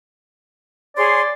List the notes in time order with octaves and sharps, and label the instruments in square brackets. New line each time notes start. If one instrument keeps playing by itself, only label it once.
[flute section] G#4 C#5 C6 [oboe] D5